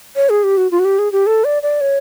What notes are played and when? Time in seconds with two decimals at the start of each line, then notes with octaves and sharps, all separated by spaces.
0.16 C#5
0.29 G#4
0.44 G4
0.57 F#4
0.71 F4
0.79 F#4
0.85 G4
0.99 G#4
1.12 G4
1.27 A4
1.44 D5
1.63 D5
1.81 C#5